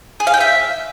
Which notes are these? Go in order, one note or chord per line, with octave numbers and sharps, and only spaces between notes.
G#4
F5
G5
E5